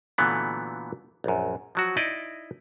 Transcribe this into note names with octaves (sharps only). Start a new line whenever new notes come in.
A#2 D3 E3 F#3 A3 B3
A#1 F#2
F3 F#3 F#4
D#4 E4 D5 D#5